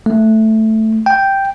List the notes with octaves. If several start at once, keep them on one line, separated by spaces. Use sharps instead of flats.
A3
G5